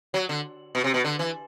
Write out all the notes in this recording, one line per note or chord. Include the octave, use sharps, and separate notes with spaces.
F#3
D3
B2
C3
B2
D3
E3